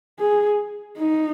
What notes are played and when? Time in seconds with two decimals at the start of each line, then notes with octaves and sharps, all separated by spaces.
0.19 G#4
0.97 D#4